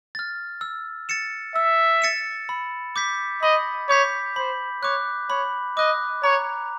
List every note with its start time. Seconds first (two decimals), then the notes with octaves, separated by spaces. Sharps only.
0.15 F6 A6
0.61 E6
1.09 A6 C#7 E7
1.55 E5 E6
2.02 A6 C#7 E7
2.49 B5
2.96 D6 G6 B6
3.43 D#5 B5
3.89 C#5 D6 G6 B6
4.36 C5 B5
4.83 C#5 D6 F#6
5.30 C#5 B5
5.77 D#5 D6 F#6
6.23 C#5 A#5